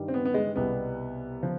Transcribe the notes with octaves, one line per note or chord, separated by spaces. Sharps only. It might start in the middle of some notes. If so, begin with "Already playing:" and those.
Already playing: G2 D#3 G3
C4
B3
B3
G#3
C2 B2 G3 B3
F3